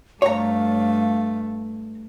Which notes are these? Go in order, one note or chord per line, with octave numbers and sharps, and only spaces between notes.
G2 A3 C#5 F5 A#5